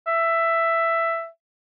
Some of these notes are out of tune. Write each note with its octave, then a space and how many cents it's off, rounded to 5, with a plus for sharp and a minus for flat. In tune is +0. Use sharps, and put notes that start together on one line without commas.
E5 +10